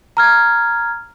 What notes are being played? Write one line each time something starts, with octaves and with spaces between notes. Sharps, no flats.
A#5 F6 G#6